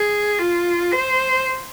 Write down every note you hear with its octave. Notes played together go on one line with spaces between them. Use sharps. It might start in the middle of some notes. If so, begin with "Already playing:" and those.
Already playing: G#4
F4
C5